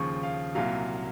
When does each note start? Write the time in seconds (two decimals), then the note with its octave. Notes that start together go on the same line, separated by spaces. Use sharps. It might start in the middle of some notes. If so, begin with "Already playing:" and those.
Already playing: D#2 C#3 F3 C#6
0.23 F5
0.55 C2 A#2 F#3 F5